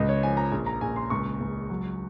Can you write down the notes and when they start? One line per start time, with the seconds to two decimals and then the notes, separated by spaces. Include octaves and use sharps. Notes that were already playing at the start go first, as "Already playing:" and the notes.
Already playing: C#2 D#5
0.09 C#5
0.23 F3 G#5
0.37 A#5
0.52 A#1
0.66 A#5
0.81 A#1 G#5
0.96 C6
1.10 C#2 C#6
1.40 C#2
1.70 F#3